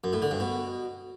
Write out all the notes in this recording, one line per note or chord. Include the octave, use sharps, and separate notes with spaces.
F#2
A2
D3
G2
B2